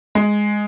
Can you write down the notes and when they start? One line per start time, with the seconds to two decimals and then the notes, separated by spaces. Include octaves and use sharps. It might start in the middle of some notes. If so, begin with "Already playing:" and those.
0.15 G#3